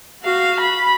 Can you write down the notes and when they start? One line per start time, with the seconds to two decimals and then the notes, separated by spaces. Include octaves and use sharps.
0.23 F#4 F5
0.61 B5